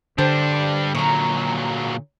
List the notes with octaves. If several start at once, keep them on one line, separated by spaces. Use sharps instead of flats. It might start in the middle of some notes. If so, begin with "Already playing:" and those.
D3 G3 D4 C5
A#2 F#3 A#5 C#6